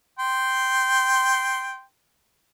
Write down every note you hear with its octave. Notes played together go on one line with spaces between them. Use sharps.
G5 C6